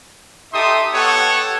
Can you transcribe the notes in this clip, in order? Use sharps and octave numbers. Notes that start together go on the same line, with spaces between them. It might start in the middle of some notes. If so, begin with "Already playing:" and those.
D#4 G4 A4 E5 C6 D#6
B3 G4 A4 C#5 F#5